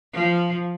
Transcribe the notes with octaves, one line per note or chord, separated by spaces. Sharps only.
F3